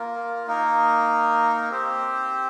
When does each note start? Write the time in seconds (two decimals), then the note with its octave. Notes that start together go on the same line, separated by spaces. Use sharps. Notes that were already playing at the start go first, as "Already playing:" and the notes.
Already playing: A#3 F4 A#4
0.47 A#3 D#4 A#4
1.70 C4 G4 C5